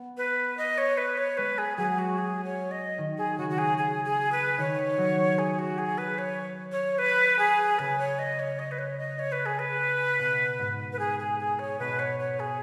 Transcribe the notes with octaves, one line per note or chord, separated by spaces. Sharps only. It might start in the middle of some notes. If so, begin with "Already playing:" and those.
Already playing: B3
B4
D#5
C#5
B4
C#5
G#3 B4
G#4
F#3 G#4
F#4
G#4
C#5
D#5
D#3
G#4
C#3 F#4
F#4
G#4
G#4
G#4
B4
D#3 C#5
F#3
G#4
F#4
G#4
B4
C#5
C#5
B4
G#4
C#3 B4
C#5
D#5
C#5
D#5
B4
C#5
D#5
C#5
B4
G#4
B4
B2
G#2
B4
G#4
G#4
G#4
C#5
B2 B4
C#5
C#5
G#4